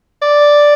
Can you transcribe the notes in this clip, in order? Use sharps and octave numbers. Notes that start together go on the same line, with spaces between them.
D5